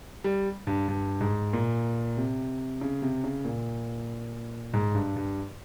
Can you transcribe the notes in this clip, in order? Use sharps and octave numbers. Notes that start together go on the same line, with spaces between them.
G3
G2
G2
G#2
A#2
C3
C#3
C3
C#3
A#2
G#2
G2
G2